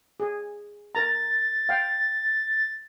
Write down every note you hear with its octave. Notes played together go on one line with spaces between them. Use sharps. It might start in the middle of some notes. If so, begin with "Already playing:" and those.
G#4
A#4 A#5 A6
F5 G5